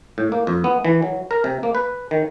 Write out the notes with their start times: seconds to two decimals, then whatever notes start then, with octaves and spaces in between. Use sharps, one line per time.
0.18 A2
0.32 A#3
0.47 F2
0.64 B3
0.85 E3
1.02 F#3
1.31 A#4
1.44 C3
1.63 A#3
1.75 B4
2.11 D#3